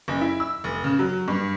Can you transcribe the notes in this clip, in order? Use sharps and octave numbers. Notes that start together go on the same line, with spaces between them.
F#1
E4
E6
F1
C#3
F#3
G2